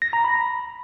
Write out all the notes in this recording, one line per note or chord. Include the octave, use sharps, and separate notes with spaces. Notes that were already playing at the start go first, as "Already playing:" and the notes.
A#6
A#5
B5